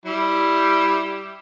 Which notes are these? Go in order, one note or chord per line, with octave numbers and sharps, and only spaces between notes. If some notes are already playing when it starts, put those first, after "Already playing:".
G3 E4 G4